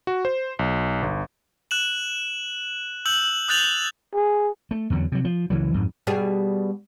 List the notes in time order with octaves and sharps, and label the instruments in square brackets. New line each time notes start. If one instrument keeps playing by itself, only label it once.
[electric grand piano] F#4
C5
B1
G1
[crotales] F#6 E7 F#7
E6 G6 F#7
D#6 F#6 G6 A6 F7 F#7
[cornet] G#4
[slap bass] A3
E2 D3 F#3
C3 F#3
F3
C#2 E3 F#3
F2 G#2
[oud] B2 G3 G#4